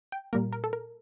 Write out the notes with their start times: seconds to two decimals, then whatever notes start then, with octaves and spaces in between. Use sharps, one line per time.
0.12 G5
0.33 A#2 G3 A#3 A#4
0.53 A#4
0.64 A4
0.73 A#4